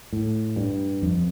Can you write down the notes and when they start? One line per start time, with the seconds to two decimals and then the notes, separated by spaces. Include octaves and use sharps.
0.13 A2
0.56 G2
1.02 F2